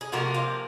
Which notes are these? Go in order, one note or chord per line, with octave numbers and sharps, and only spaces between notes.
G#4
C3 F3 A#3 F#4
F4